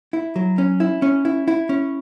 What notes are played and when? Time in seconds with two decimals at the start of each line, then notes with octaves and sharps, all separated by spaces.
0.13 E4
0.36 F#3
0.58 C#4
0.80 E4
1.02 C#4
1.25 E4
1.48 E4
1.69 C#4